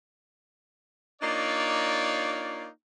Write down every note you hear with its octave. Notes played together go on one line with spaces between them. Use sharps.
A#3 D4 D#4 F4 C#5 D5